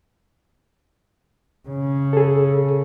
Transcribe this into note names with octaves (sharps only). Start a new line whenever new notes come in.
C#3
G#4 A4